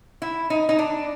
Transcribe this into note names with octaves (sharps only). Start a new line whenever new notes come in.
E4
D#4
D#4
D4